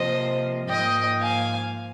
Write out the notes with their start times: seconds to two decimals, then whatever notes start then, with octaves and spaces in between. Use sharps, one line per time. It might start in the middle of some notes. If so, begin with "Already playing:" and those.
Already playing: C3 F3 A#3 C5 D#5
0.69 G#2 F3 A#3 D#5 G5
1.21 F5 G#5